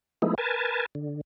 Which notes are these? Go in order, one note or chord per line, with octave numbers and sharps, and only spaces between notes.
F3 G#3 A3 B3 D#4 E4
A#4 B4 G#5 A5
D3